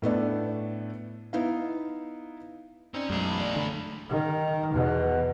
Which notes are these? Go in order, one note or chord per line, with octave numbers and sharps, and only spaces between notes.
A2 A3 B3 D4
B3 D#4 E4 F5
G2 C4 C#4 D#4 D5
B1 F#2 A2 G#3 A#5
E3 A5 B5
D4 D5
D3 A4 B5
D#3
E2 B2